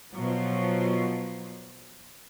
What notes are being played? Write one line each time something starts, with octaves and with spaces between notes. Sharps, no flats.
B2 F3 F#3